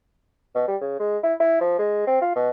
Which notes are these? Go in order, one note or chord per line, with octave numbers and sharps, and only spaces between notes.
B2
G3
C#3
G#3
E4
E4
F3
G#3
C4
F4
B2